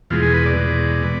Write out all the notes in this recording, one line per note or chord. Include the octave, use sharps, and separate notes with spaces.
E2 B2 G#3 F4
G#4
B4
D5
E2 B2 G#3
B2 B3